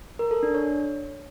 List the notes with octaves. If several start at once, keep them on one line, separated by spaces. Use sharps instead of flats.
A#4
A4
D4
C#5